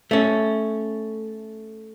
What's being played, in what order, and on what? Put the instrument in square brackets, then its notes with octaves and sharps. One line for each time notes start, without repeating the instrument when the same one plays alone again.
[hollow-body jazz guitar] A3 C#4